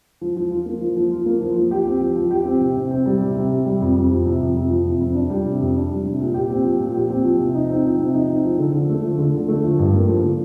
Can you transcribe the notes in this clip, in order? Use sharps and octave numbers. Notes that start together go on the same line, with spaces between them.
F3
F3
F4
A#3
F3
F3
F4
A#3
F3
F3
G4
C4
F3
F3
G4
C4
C3
C3
C4
G3
C3
C3
C4
G3
F2
F2
F3
C3
F2
F2
F3
C3
F2
D4
G3
C3
F2
D4
G3
C3
A#2
G4
C4
F3
A#2
G4
C4
F3
C3
D#4
C4
F3
C3
D#4
C4
F3
D3
D3
A3
F3
D3
D3
A3
F3
G2
A#3
F3
D3